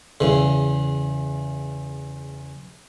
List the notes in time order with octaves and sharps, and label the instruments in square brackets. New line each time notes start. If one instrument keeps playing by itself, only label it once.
[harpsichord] E2 C#3